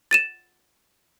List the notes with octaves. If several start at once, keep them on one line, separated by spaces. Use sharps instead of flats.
A6 D#7 E7